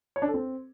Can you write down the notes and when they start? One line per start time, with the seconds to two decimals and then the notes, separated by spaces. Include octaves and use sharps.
0.16 C#5
0.22 D4
0.28 A4
0.34 C4